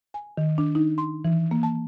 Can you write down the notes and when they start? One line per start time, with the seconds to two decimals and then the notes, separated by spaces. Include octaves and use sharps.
0.14 G#5
0.37 D#3
0.58 D4
0.75 D#4
0.98 C6
1.25 E3
1.51 A#3
1.63 A5